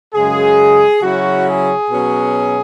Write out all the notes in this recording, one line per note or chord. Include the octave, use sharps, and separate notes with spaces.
F#2 C#3 G#3 G#4
C#3 F#3 C#4 E4 F#4
G#4
B2 F#3 C#4